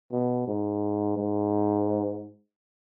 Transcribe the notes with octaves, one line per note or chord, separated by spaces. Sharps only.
B2
G#2
G#2